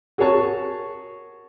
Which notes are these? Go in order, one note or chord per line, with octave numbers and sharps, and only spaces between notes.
F#4 G#4 A#4 C#5 A5 C#6